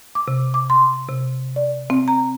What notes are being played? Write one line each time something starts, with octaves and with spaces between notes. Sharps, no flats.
D6
C3
D6
C6
C3
D5
C4
A#5